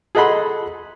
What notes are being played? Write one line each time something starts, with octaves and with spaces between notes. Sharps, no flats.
G#4 A4 D#5 F#5 B5 C6